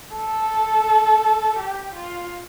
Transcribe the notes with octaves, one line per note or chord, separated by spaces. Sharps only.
A4
G4
F4